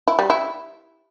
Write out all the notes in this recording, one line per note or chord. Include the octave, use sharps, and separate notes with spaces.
E4
G3
E4